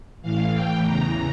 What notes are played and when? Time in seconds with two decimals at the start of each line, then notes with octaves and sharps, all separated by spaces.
0.22 A2 E3 F5
0.53 A2 E3 G5
0.84 E2 C#3 E3 A#5